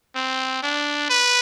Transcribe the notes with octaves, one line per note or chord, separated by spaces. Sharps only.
C4
D4
B4